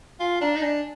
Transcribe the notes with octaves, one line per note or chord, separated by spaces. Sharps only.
F4 G#5
D4 A#5
D#4
D4 G#5